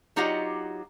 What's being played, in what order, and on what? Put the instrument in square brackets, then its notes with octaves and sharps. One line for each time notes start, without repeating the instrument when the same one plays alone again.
[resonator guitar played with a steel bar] F#3 D#4 F4 G4 D#5 F#5